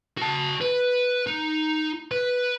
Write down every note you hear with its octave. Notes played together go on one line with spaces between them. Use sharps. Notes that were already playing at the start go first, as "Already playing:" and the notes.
F#4 A5
B4
D#4
B4